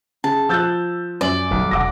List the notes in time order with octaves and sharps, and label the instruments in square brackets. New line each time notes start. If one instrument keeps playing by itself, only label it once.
[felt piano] C#3 [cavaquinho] A5
[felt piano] F3 F#6 [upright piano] E6 G6 A6
[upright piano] F#2 F#7 [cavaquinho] D5
[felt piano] B1 [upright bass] D#3 G3
[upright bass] E1 C2 [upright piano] F#5 D6 A#6